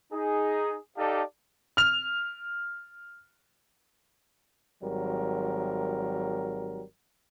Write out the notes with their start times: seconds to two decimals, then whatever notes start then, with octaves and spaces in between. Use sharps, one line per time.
0.12 D#4 G#4
0.96 D#4 G4 A4 D5 F5 A5
1.77 F6 F7
4.83 G#1 F#3 G3 A#4